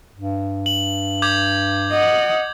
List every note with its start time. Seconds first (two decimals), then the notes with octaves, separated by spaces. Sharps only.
0.14 G2
0.66 F#7
1.22 D6 G6 G#6
1.92 D#5 F#5